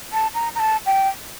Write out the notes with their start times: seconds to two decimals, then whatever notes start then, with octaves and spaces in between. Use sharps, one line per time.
0.13 A5
0.34 A#5
0.55 A#5
0.60 A5
0.86 G5